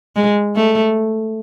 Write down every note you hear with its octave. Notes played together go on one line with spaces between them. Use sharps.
G#3
A3